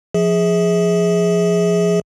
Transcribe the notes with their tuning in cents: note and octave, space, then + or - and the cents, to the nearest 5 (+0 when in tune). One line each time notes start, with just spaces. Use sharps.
F3 +0 G#4 +0 E5 -35